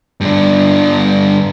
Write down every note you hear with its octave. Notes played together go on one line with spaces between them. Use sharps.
G2 D3